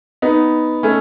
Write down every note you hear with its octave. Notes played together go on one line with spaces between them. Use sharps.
B3 D#4
A3 C#4